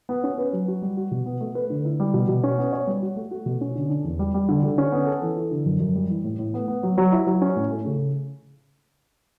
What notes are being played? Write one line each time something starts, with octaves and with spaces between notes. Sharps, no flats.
B3
C#4
B4
F#3
F#4
G3
F#4
B2
B3
A3
B4
D3
E4
G3
B2
B2
C#4
B3
C#5
G3
F#4
A3
F#4
B2
C#4
D3
D4
E2
G3
G3
D3
D3
C#4
B3
A4
E3
E4
D3
F#2
F#2
G3
E3
A2
A2
B3
B3
F#3
F#3
E4
F#3
C#4
A2
A3
C#3